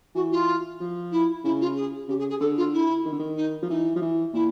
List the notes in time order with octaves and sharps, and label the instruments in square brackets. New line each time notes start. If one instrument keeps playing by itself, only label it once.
[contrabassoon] E3 [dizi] F#4
[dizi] F4
[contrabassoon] F3
[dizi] E4
[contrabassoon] C#3 [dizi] E4
[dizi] F4
G#4
[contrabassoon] C#3 [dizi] G4
[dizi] G#4
G#4
[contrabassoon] D3 [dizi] A4
[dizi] F4
E4
[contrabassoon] D#3
D3
D#3
[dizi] D#4
[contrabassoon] F3
[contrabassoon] E3 [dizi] D#4
[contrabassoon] F3
E3
[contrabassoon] A#2 [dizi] E4